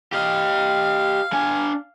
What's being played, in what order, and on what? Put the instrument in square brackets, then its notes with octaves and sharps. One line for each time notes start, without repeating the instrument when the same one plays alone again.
[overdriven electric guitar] G4 D#5 [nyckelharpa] F5
[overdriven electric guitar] D4 G#5